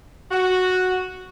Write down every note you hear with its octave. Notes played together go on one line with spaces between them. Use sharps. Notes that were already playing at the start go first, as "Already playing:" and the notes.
F#4